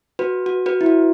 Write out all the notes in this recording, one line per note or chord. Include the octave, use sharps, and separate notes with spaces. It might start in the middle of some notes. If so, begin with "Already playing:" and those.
F#4 B4
F#4
F#4 B4
E4
F#4